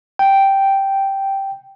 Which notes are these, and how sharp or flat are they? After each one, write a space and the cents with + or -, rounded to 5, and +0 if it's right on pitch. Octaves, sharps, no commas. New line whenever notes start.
G5 -5